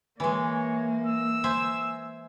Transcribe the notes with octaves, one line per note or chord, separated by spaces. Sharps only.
E3 G#3 A#3 C#5
E6
C5 E5 G#5